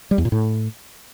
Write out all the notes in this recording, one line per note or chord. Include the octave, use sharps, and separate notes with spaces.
G3
E2
A#2
A2